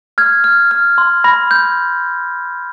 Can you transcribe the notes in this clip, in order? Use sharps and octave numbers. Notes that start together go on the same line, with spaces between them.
F6 G#6
F6
F6
C6
B5 A#6
G6